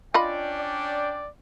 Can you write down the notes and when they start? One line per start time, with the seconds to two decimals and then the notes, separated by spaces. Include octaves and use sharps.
0.14 C#4 D4 F4 D5 D#5 G5 B5
0.58 D5